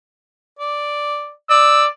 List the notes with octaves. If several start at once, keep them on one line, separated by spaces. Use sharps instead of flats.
D5
D5 E6